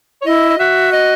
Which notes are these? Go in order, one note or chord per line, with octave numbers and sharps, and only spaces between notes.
C#5
E4 D#5
D#5
F#4 E5
D#5